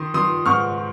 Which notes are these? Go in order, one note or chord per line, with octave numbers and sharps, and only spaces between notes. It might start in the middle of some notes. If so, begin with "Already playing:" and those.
Already playing: D#3 C6 D#6
D#3 C6 D#6
G#2 C#6 F6